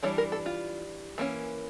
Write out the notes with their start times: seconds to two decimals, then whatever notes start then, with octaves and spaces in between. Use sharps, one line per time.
0.03 E3 G3 D4 C#5
0.18 A#4
0.32 A4
0.46 F4
1.18 E3 A#3 C#4